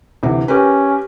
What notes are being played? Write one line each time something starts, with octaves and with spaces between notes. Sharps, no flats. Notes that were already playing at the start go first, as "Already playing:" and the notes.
D2 C3 E3
C#4 G4 A#4 B4